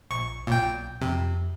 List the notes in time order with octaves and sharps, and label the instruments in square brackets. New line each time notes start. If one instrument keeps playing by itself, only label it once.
[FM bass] A#1 [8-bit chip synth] C#6
[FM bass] B1 [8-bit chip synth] A#2 G5
[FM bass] F2 [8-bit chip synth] C3